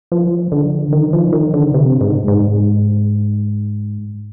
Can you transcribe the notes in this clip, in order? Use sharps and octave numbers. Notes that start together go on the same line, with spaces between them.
F3
D3
D#3
F3
D#3
D3
C3
G#2
G#2